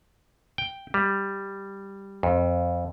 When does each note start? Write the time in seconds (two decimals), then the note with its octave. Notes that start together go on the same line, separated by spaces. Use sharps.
0.58 G5
0.94 G3
2.23 F2